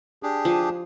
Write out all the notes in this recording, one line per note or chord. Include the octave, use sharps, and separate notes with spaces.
D4 G4 G#4
F3